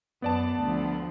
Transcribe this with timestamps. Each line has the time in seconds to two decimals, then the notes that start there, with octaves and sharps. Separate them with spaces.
0.22 F#2 B3 D5 A5
0.60 D2 F3